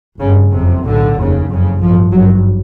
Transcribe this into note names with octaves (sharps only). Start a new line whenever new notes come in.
G1 G2 C#3
F#1 F2 C3
B1 A2 D3
F1 D#2 C#3
F#1 F2 C#3
A1 G2 F3
G#1 G2 F#3